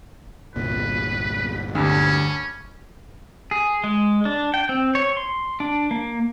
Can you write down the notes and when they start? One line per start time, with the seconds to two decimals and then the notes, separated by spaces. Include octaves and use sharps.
0.56 G1 C2 A#2 B4
1.75 D2 G2 C#4
3.51 G#4
3.84 G#3
4.25 D4
4.54 G5
4.69 C4
4.95 C#5
5.17 C6
5.60 D4
5.91 A#3